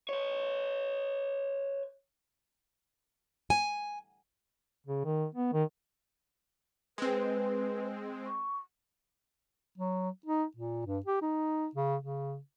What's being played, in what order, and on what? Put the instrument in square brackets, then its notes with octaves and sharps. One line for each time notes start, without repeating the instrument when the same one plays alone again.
[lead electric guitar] B4 C#5
[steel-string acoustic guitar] G#5
[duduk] C#3
D#3
B3
D#3
[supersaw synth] G#3 C4 [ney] B4
[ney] C#6
[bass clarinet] F#3
D#4
A#2
G2
G4
D#4
C#3
C#3